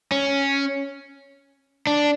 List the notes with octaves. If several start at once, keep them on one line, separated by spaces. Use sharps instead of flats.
C#4
D4